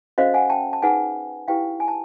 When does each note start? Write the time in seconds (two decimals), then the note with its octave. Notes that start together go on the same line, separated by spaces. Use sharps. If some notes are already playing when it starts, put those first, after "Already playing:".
0.18 C#4 F#4 A4 C5 D#5 F5
0.34 F#5 G#5
0.50 G5 A5
0.73 A5
0.82 D#4 G#4 B4 F#5 G#5
1.48 E4 G4 B4 F5 G5
1.80 G#5
1.88 A5